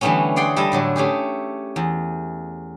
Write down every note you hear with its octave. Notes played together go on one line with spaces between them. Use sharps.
D3 E3 G3 A3 B3 C#4
G#4 D5 F#5 G5 C6
G3 E4 A4 D#5 A5
A2 D3 F#3
A3 C#4 G4 G#4
E2